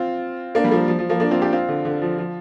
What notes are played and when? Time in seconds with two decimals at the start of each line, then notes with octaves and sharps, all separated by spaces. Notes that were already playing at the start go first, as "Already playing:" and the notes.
Already playing: C4 F4
0.55 A#3 D4
0.64 G3
0.71 F3 A#3
0.88 F3
0.99 F3
1.09 F3 A#3
1.20 A#3 D4
1.31 C4 F4
1.41 D4 G4
1.52 C4 F4
1.69 D3
1.85 D3
2.02 F3
2.18 F3